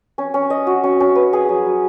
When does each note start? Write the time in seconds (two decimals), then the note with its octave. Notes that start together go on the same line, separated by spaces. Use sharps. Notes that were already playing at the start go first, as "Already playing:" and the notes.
0.18 C#4
0.34 C#4
0.50 D#5
0.67 F#4
0.84 C#4
1.00 C#4
1.15 B4
1.33 G#4
1.49 F#3
1.66 F#3